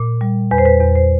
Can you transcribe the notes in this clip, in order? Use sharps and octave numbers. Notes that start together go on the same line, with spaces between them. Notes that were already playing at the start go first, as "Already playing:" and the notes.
Already playing: A#2
G3
E2 B4
C5
B4
E2
C5